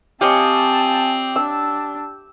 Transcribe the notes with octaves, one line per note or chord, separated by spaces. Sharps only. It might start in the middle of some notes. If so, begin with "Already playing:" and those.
C4 F4 G4 C#5 D#5 G#5 A5
D4 E6